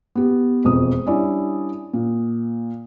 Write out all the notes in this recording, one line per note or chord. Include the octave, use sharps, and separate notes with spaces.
B3 G4
E1 F2 F3 D#6
G3 C#4 D4 E4 D5
A#2